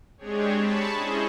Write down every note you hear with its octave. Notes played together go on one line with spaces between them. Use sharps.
G#3 C4 D4 G4 G#4 C#5
A5 B5 C#6
C#4 E4 G#4 C5 D#5